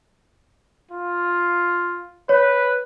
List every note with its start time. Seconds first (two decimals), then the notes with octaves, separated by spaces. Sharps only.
0.91 F4
2.29 B4 C#5